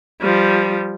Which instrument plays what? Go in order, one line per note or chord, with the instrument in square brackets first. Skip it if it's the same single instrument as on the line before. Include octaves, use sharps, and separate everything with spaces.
[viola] F3 G3